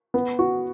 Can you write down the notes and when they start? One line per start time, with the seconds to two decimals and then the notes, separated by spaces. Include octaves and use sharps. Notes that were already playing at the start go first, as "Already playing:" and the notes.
0.14 B3
0.39 F#4